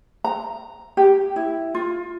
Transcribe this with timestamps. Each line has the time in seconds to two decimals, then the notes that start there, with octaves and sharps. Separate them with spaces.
0.24 A#5
0.97 G4
1.36 E4
1.75 F4